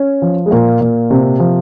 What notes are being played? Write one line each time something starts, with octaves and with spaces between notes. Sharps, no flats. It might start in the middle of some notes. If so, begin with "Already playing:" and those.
Already playing: C#4
F3
G#3
A#2 A#3
A#2
C3
F3